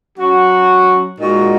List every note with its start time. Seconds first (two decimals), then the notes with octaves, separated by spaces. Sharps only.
0.18 F#3 C#4 F#4
1.19 A#2 G#3 D#4 F#4